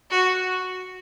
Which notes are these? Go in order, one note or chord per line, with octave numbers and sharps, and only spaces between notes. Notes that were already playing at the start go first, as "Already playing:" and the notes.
F#4